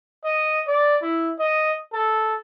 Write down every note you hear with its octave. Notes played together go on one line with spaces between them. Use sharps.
D#5
D5
E4
D#5
A4